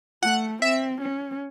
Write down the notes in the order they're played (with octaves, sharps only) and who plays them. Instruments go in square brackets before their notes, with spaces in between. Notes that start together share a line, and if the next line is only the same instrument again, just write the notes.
[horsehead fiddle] A3 [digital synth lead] F#5
[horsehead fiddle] C4 [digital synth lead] E5
[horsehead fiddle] C#4